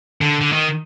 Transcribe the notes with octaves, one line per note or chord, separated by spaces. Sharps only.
D3
D3
D#3